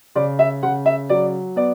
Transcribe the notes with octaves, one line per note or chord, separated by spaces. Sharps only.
C#3 D5
E5
C#3 F#5
E5
F#3 D5
B3 D5